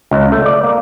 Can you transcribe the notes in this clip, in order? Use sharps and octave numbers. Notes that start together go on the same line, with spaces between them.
C#2
A3
D5
A#3